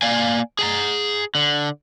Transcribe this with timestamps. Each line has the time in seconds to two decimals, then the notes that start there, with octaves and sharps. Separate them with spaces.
0.02 A#3 D5 F5 G#5
0.59 G#4 G#5 A#5
1.35 D3